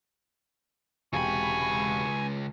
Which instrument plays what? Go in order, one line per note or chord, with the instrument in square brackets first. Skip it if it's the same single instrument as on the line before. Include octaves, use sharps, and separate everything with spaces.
[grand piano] E1 C3 G5 [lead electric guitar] C#2 B5 [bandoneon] G#5 [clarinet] C#6